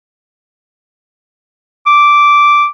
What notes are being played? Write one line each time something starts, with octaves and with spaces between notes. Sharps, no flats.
D6